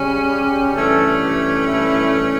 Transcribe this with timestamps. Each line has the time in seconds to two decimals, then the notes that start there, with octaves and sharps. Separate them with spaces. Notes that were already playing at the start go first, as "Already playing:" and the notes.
Already playing: C#3 G3 C#4
0.29 G4
0.74 G2 E3 A3 C#4 A4
1.21 G4
1.66 E4